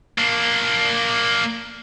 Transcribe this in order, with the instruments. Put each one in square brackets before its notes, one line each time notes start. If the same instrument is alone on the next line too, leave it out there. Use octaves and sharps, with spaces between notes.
[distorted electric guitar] A#3 D4